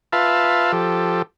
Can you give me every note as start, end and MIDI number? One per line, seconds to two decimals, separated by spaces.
0.13 0.72 65
0.13 0.72 71
0.13 0.72 76
0.13 0.72 77
0.13 0.72 81
0.72 1.22 53
0.72 1.22 67
0.72 1.22 69